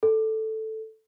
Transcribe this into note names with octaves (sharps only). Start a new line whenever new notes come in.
A4